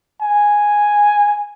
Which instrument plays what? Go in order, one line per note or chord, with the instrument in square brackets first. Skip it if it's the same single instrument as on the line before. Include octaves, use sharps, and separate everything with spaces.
[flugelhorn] G#5